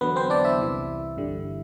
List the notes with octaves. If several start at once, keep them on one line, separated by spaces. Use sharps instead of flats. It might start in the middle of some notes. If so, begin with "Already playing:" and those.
E2 D3 F#3 B3 B4
C4 C5
D4 D5
E4 E5
C2 C3 E3
G1 G2 D3 G3